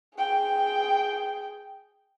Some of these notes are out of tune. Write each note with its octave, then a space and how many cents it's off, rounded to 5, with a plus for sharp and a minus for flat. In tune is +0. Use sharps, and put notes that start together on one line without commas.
G#4 +0 G5 +0